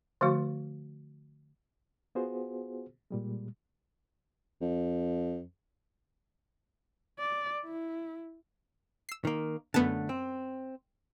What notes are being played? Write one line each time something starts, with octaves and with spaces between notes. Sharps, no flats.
D3 F3 A3 F#4
B3 F4 F#4 G#4 C5
A#2 G3 G#3
F2
D5
E4
E6 C7
D#3 A#3
F#2 D3 A3 B3 A5
C4